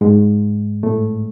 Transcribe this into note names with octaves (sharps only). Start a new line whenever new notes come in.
G#2 G#3
A2 A3